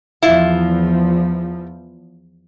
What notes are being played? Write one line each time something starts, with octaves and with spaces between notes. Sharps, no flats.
E2 F3 E4 F4